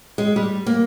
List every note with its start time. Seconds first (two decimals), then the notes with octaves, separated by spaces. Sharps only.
0.18 G#3
0.36 G3
0.67 A#3